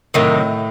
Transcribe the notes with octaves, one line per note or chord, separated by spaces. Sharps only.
A2 C3 D#3 F#3